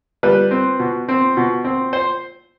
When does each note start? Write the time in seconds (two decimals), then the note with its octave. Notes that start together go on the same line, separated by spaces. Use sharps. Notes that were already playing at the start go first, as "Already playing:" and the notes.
0.23 G3 B4
0.51 C4
0.79 B2
1.09 C4
1.37 B2
1.65 C4
1.93 C5